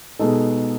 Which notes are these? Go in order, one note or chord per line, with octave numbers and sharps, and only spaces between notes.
B2 G#3 D#4 A4